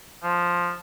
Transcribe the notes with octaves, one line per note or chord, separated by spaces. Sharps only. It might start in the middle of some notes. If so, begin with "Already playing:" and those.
F3